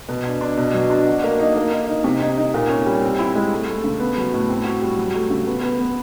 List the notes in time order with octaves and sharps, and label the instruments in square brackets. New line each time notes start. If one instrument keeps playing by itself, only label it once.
[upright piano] B2
D4
D4
B2
F#3
D4
F#4
A#3
D#4
A#3
D#4
D#4
C3
D#4
D#4
A#2
C#4
G3
C4
E4
G#3
A3
A3
C#3
B3
F#3
A2
C4
F#4
G3
F#3
A3
C#3
B3
B3
B3